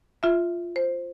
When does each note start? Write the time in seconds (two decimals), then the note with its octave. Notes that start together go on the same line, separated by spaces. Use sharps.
0.23 F4 E5
0.76 C5